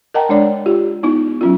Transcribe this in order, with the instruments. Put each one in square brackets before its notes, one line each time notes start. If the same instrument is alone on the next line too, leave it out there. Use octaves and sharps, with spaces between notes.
[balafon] A#4 D#5 F#5 G5 A5 A#5
G#3 D4 C#5 D5
F4 G4
B3 D#4 E4
F#3 C#4 F4